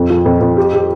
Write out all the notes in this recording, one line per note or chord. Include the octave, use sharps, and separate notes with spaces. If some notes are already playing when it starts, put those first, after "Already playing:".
Already playing: F2
F3
F2
F2
G4
G4